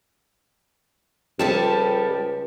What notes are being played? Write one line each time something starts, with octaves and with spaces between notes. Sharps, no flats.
C#2 F3 G3 G4 A4 C5 A5